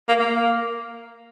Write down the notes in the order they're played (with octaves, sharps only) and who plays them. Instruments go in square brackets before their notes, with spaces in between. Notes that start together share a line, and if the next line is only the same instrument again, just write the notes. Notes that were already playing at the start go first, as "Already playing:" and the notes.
[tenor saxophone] A#3
A#3